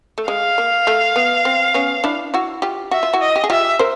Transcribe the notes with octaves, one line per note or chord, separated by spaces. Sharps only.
A3
G#3 F5
A#3
A3
B3
C4
B3 C#4
D4 E4
E4 F#4
F4 G4
F#4 E5
F4
E4 F#4
D#5
G4
G#4
F4 G4 E5
A#4 C5